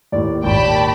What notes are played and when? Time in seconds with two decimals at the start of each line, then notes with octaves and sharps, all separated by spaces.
0.12 D#2 A2 D5
0.44 G#1 D#2 A#2 G5 A5 B5